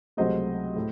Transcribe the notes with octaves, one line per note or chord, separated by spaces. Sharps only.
C#2 C3 F#3 A3 C5 D#5
A2